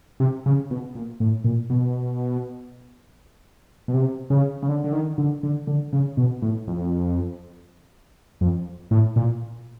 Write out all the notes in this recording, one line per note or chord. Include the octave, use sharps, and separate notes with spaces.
C3
C#3
B2
A#2
A2
A#2
B2
B2
C3
C#3
C#3
D3
D3
D#3
D3
D3
D3
C#3
B2
A2
F2
F2
A2
A#2